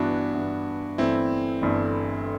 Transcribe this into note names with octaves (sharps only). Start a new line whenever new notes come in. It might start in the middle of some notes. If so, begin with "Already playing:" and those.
Already playing: G2 E3 B3 D4 E4 F#4
G2 E3 B3 E4
G1 G2 E3 A3 C4 E4
G1 G2 E3 A3